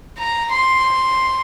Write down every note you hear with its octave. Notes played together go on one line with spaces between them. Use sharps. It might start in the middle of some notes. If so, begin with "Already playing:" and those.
A#5
C6